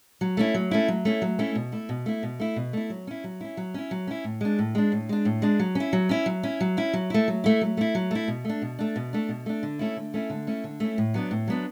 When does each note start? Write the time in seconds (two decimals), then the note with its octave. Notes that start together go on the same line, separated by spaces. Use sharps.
0.21 F#3
0.37 A3 C#4 E4
0.54 F#3
0.71 A3 C#4 E4
0.88 F#3
1.05 A3 C#4 E4
1.22 F#3
1.39 A3 C#4 E4
1.55 B2
1.72 A3 E4
1.89 B2
2.06 A3 E4
2.23 B2
2.40 A3 E4
2.56 B2
2.73 A3 E4
2.90 F#3
3.07 C#4 E4
3.24 F#3
3.41 C#4 E4
3.57 F#3
3.74 C#4 E4
3.91 F#3
4.07 C#4 E4
4.24 A2
4.41 G#3 D4
4.59 A2
4.75 G#3 D4
4.92 A2
5.09 G#3 D4
5.25 A2
5.42 G#3 D4
5.60 F#3
5.75 C#4 E4
5.93 F#3
6.09 C#4 E4
6.26 F#3
6.43 C#4 E4
6.61 F#3
6.77 C#4 E4
6.93 F#3
7.10 A3 E4
7.28 F#3
7.44 A3 E4
7.61 F#3
7.77 A3 E4
7.95 F#3
8.11 A3 E4
8.28 B2
8.45 A3 D4
8.62 B2
8.79 A3 D4
8.96 B2
9.13 A3 D4
9.29 B2
9.46 A3 D4
9.63 D3
9.79 A3 C#4 E4
9.96 D3
10.14 A3 C#4 E4
10.30 D3
10.47 A3 C#4 E4
10.64 D3
10.80 A3 C#4 E4
10.98 A2
11.14 F#3 B3 D4
11.31 A2
11.48 F#3 B3 D4